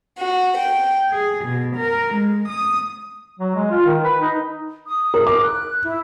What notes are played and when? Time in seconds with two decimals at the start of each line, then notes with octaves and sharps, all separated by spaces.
0.19 F#4
0.57 G5
1.10 G#4
1.44 B2
1.76 A#4
2.13 G#3
2.49 D#6
3.39 F#3
3.55 G#3
3.71 F4
3.85 D#3
4.04 B4
4.20 D#4
4.86 D#6
5.14 A#4
5.27 A#4 D6
5.43 F#6
5.84 E4